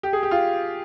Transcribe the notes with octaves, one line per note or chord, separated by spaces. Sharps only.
G4
G#4
G4
F4